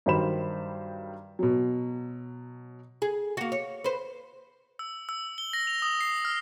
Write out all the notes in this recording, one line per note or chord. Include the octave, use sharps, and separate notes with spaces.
G2 D#3 F#3 C5 B5 E7
B2 F#3
G#4
A#3 F#4
C#5
B4 C5
E6
E6
G7
A#6
F7
D#6
C7
F6